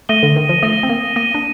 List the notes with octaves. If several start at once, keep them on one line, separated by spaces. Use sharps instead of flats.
A3 D#6 A#6 D#7 G7
D3
D#3
F3
A3 D#6 A#6 D#7 G7
C4
A#3
A#3 D#6 A#6 D#7 G7
D4